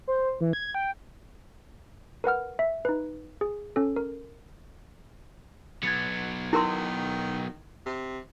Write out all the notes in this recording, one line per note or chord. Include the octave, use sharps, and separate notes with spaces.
C5
E3
G#6
G5
A#4 B4 F#5 F6
E5
D#4 B4
G#4
C#4 A4
A#4
F#3 B3 G#6 A6 C#7
D#3 E4 A#4 C6
C3